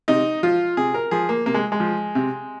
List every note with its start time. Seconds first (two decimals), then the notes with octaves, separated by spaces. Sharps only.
0.08 C3 D#4
0.43 F3 F4
0.77 C3 G#4
0.94 A#4
1.11 F3 G#4
1.29 A#3
1.46 C3 A#3
1.54 G#3
1.72 G#3
1.80 F3
2.15 C3